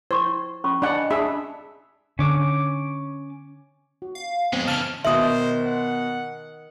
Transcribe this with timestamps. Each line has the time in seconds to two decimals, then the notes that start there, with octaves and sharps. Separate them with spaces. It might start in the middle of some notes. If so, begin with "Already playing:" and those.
0.11 E4 C5 C#6
0.64 C#4 B5 C#6
0.82 D4 D5 D#5 F#5 G#5 B5
1.11 D4 G#4 E5 B5
2.19 D3 C#4 D6
4.02 F#4
4.15 F5
4.53 F2 G#3 B3 C4 C5
4.68 C#3 E3 A5 F6
5.05 B2 D#3 D#4 C5 E5 D#6 F#7
5.67 F#5